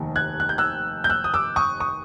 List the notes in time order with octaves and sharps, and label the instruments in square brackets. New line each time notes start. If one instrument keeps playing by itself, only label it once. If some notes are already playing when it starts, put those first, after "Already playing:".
Already playing: [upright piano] F1 D#2 D#3
F#6 G#6
F#6
G6
E6 F#6
G6
E6 F#6
D#6
D6 E6
C#6 D#6
C#6 D#6